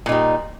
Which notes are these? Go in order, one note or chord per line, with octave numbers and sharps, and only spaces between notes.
A#2 G3 D#4